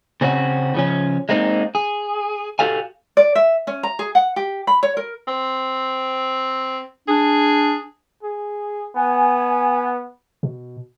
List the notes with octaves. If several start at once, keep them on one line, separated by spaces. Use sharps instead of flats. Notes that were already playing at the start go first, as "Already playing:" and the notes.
C#3 C4 C#4 F#4
C#3 F3 C#4
G#3 A#3 C4 D#4
G#4
F#4 G4 A4 F5 G#5
D5
E5
C#4
A#5
G#4
F#5
G4
B5
C#5
A#4
C4
D4 G#4
G#4
B3 G#5
B2